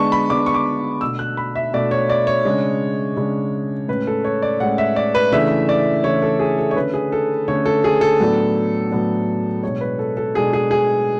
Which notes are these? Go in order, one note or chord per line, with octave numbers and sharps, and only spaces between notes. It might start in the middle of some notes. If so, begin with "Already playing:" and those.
Already playing: D3 G#3 B3 D4 A5 C#6
B5
D3 G#3 B3 D4 D6
C#6
D6
B2 A3 D4 E6
F#6
B5
E5
B2 A3 D4 D5
C#5
D5
C#5
C#3 G#3 D4
C#3 G#3 D4
A2 G#3 C#4 B4
A4
C#5
D5
A2 G#3 C#4 F#5
E5
D5
B4
C#3 E3 A3 D4 E5
D5
C#3 E3 A3 D4 C#5
A4
G#4
A4
C#5
D3 A3 C#4 B4
G#4
A4
D3 A3 C#4 C#5
A4
G#4
A4
A2 F#3 B3 D4
A2 F#3 B3 D4
B2 G#3 D4 C#5
B4
A4
A4
B2 G#3 D4 G#4
G#4
G#4